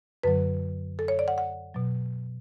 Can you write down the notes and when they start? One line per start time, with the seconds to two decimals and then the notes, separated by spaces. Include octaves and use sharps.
0.23 F#2 D3 F#3 B4
0.99 A4
1.08 C#5
1.19 D5
1.28 F#5
1.38 F#5
1.74 B2 F#3